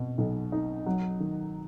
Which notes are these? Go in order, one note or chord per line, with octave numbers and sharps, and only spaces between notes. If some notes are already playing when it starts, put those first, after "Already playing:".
Already playing: B2
B1
D#4
F#3
D#3